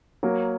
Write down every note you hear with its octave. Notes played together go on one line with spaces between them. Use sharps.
F#3 A#3